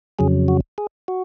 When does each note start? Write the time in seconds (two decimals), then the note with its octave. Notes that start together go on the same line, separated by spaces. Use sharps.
0.19 F2 C#3 F#3 G#4
0.48 F#4
0.78 G#4
1.08 F#4